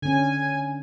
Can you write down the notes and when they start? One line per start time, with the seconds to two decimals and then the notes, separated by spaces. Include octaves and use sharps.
0.02 D3 C#4 G#5